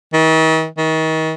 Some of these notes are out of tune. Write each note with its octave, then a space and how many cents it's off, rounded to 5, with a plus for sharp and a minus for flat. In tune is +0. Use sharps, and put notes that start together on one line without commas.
D#3 +45
D#3 +35